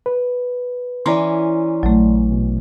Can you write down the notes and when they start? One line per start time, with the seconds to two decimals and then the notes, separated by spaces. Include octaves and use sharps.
0.06 B4
1.06 E3 C#4 D5 A#5 C6
1.83 A#1 F#3 A3
2.31 B2